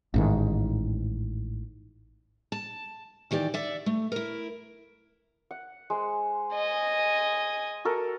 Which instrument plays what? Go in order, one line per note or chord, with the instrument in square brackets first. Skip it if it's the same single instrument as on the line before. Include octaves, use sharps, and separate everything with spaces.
[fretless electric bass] A1 G#2 D#3
[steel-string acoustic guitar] A5
D#3 E3 G4 D5
D5 E5 F#5
A3
E4 A#4
[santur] F#5
G#3 C5
[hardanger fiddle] D#5 G#5
[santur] F#4 A4 A#4